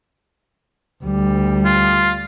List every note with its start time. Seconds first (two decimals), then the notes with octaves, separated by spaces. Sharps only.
1.03 D2 G3
1.65 F4